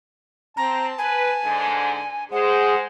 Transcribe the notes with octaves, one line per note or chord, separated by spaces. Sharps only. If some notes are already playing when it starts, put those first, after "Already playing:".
C4 A5 A#5
B4 G#5
G#2 D3
G#3 G#4 C5 F#5